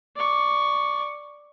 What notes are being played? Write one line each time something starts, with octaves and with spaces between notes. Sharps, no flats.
D5 C#6